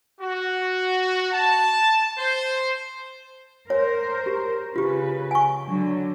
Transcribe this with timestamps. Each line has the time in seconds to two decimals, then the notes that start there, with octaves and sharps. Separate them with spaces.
0.21 F#4
1.33 A5
2.18 C5
3.70 A#4 C5 C#5
4.26 G4
4.76 C#3 F4 G4 B4
5.31 G#5 C#6
5.66 D3 F#3